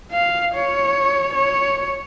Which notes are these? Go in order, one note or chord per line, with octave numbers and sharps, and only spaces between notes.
F5
C#5
C#5